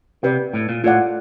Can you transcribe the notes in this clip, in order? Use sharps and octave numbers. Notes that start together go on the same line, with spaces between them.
C3 G4 B4 D5
A2
A#2
A2 F4 A4 D5 F#5